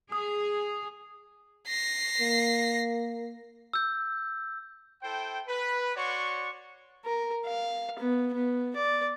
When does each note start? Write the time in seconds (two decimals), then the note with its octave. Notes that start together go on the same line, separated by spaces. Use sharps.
0.12 G#4 D#6
1.68 A#6 C7
2.21 A#3
3.73 E6 G6
5.02 E4 A4 C5 G5
5.47 B4
5.95 F#4 C#5 D5 F#5 C6 C#6
7.06 A#4
7.45 F5
7.99 B3
8.34 B3
8.76 D5